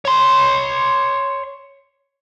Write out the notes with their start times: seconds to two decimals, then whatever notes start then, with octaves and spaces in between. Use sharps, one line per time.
0.05 C#5 C6